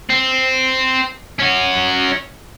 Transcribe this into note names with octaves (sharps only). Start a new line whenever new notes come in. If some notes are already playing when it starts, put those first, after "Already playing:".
C4
C#4 F#4